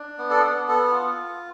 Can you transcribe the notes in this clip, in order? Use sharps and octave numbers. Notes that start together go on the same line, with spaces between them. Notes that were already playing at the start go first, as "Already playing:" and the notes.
Already playing: D4
B3
A4
B3
B3 A4
F4